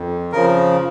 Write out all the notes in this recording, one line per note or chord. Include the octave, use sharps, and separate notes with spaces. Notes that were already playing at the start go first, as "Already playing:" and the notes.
Already playing: F2
C#3 F3 A#4